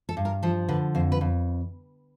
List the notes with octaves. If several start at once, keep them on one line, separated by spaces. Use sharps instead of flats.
A4
G2
A#4
F3 A4
D3 B4
F2 C5
B4
F2